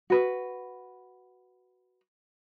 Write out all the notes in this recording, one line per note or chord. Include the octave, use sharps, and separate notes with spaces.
F#4 B4